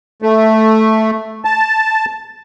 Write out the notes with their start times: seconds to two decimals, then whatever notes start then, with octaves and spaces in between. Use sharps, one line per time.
0.22 A3
1.45 A5